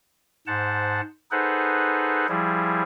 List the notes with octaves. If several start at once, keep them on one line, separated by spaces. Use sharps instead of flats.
G#2 C5 F#5 A5
D#4 G#4 A4 B4 C5 F#5
F3 G3 E4 G#4